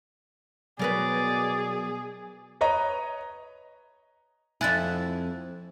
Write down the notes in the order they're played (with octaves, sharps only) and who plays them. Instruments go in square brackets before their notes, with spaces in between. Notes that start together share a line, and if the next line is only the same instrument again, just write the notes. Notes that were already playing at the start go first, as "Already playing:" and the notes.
[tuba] B2 [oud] F#3 A#4 B4 [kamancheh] G#4 [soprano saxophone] D5
[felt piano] B4 C#5 D#5 A#5
[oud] F2 E4 [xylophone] G#5 F#6 A6